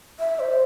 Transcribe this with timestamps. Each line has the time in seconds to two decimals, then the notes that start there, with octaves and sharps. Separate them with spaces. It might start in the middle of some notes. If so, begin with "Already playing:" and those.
0.19 E5
0.40 C5